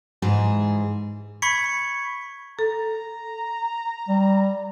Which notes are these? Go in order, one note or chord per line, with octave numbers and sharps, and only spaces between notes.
G#2 E3 G#4
B5 C#6 G#6 B6 C#7
A4 A#5
G3